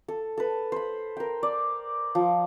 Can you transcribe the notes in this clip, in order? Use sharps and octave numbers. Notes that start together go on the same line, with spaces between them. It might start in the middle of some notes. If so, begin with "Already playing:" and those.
A4
A4 B4
C5 B5
A#4 G5
D5
F3